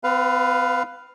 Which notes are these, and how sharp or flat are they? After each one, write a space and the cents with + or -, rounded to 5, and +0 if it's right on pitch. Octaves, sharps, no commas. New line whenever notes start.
C4 -45 B4 +10 F5 +0